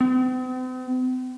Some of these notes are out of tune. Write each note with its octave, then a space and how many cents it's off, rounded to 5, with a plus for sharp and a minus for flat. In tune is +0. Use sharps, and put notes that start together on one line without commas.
C4 -45